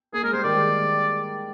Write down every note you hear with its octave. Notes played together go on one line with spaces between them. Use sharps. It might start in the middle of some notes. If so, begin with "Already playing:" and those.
A#3 G#4
G#3 A#4
G3 C5
D#3 D5
G#3